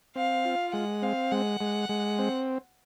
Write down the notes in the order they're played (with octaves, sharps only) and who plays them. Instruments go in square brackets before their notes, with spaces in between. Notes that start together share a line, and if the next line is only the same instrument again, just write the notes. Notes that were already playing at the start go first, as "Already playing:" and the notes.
[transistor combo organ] C4 [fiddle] F5
[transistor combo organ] F4
[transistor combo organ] G#3 [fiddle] F#5
[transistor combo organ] C4 [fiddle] F5
[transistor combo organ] G#3 [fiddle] F#5
[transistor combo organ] G#3
G#3
C4